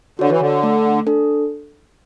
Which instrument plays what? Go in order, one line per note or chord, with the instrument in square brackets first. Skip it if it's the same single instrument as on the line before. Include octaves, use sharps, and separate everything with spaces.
[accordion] D3 [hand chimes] F#4 C#5
[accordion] E3
D3
[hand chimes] A3
D4 A4